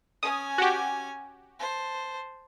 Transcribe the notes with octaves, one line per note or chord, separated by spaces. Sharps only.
C#4 G#5 D#6
F#4 G4
C5 A5